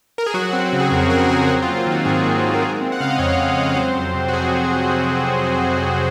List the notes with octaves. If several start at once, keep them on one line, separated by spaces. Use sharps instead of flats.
A#4
G#4
F#3 F#4
C4
C#3
G#4
F2 A#4
F#3 A#4
C4 G#4
F#3 F#4
F4
A#3
F4
D#3 F#4
G#2 G#4
F#3
A#3
A#4
G#3 G#4
C4
F#5
C#3 F5
D#5
F2 C#5
G#3
C4
F#3 C5
F2
C3
F#4
F2 G#4
F#3